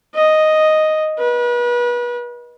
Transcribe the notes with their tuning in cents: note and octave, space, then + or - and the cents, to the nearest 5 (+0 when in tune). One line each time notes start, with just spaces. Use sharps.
D#5 +0
B4 -35